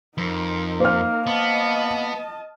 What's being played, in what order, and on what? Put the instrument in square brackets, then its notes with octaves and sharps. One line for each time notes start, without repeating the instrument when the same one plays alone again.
[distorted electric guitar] F2 [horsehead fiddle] D#4 A#4
[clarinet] A#3 [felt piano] C5 F6
[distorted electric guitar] B3 [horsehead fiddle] D#5 A5